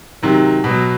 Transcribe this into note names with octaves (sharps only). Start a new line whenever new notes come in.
C3 D#3 F#3
B2
F#3